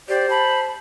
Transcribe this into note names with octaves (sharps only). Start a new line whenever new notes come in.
G4 C5 D5
A5 B5